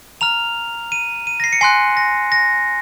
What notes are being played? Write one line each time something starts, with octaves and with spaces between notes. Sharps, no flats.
A#5 F6 F7
D#7
D#7
A#6
C7
C#7
G#5 C6 F#6 C7
A#6
A#6